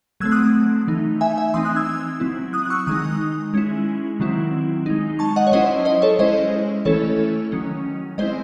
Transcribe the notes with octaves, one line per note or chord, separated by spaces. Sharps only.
F#3 A3 C4 E6 G#6
D#6 F#6
E3 A3 D#4
E5 G#5
E5 G#5
E3 C4 D#4 C6 D#6
D#6 F#6
E6 G#6
F#3 C4 E4
D#6 F#6
F#6
C#6 E6
D#3 G#3 D#4 D#6 F#6
G#3 C#4 E4
D#3 F#3 C4 E4
G#3 D#4
A5 C#6
D#5 F#5
C#5
F#3 C#4 E4 C5 D#5
C5 D#5
A4 C#5
G#3 C#4 E4 C5 D#5
E3 A3 C#4 E4 A4 C#5
D#3 F#3 C#4
G#3 C4 E4 C5 D#5